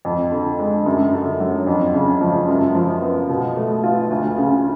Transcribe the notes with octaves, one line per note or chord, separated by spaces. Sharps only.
F2
D3
G#3
F#2
D3
F#3
F2
C#3
F3
F#2
F3
B3
B2
A3
F4
D2
C#3